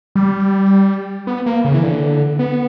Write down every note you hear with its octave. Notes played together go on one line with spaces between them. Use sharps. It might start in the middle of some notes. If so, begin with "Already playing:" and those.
G3
B3
A#3
C#3
E3
D3
B3